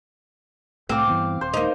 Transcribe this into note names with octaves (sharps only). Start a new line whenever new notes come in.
C2 A2 A3 C4 F5 D6
G2 E3 B3
D#1 C5
A#3 D#4